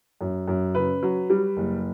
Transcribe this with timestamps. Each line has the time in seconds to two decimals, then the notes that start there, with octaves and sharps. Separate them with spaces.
0.21 F#2
0.48 F#2
0.75 C#3 B4
1.02 F#3
1.30 G3
1.57 F#1